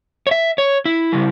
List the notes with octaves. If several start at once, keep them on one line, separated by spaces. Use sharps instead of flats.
C#5
E5
C#5
E4
C#3 G3